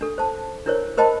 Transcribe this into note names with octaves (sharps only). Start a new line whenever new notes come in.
D4 A4
C5 A5
D4 E4 A#4 C5 C#5
A#4 C5 D#5 G5 A5 B5